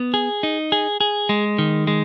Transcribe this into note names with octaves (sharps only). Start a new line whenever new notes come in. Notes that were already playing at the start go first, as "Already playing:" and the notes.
Already playing: B3
G#4
D#4
G#4
G#4
G#3
D#3
G#3